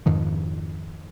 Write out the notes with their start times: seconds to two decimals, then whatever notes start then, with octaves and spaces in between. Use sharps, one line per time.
0.06 F2 G#2 D#3 F3